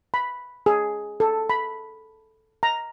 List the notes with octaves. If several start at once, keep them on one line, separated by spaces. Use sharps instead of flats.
B5
G#4
A4
B5
A#5